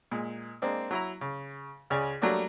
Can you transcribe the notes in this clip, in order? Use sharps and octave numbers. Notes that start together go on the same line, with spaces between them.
A#2 G#3
G#3 A#3 C4 D4
F#3 E4 A#5
C#3
C#2 C#3 G#4 D5 G#5
F#3 G3 A3 A#3 D4 F#4